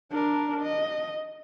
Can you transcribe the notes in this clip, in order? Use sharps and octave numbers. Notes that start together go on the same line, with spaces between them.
D4 A#4
D#5